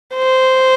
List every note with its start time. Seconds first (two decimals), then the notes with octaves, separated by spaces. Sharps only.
0.16 C5